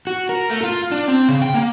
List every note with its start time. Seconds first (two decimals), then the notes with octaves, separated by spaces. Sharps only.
0.07 F#4
0.29 A#4
0.50 A3
0.63 F4
0.92 D4
1.08 C4
1.29 C#3
1.42 G5
1.54 A#3